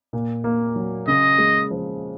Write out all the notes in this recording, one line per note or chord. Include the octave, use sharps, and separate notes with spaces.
A#2
A#3
F#3
C#3 D#5
G#3
F3